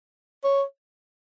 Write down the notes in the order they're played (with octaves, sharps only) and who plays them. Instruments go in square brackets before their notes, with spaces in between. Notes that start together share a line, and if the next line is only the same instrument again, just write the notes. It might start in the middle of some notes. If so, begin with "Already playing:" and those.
[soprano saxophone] C#5